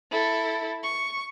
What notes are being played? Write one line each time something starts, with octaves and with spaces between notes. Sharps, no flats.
E4 A4
C#6